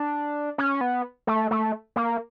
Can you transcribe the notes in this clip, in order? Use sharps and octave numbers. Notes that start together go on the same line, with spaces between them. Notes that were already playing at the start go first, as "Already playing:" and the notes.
Already playing: D4
C#4
B3
A3
A3
A#3